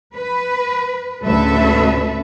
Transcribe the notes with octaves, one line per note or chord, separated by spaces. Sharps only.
B4
D2 A2 C#3 A4 B4 E5